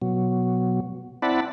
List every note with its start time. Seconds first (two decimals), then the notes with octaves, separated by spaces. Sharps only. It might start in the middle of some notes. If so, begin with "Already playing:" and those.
0.02 B2 F#3
1.22 C4 E4 D5 F#5 A5 B5